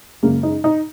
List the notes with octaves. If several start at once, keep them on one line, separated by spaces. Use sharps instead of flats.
F#2 C#3 G#3 A#3
D#4
D#4